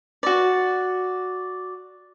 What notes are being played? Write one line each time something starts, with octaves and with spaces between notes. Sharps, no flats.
F#4 D5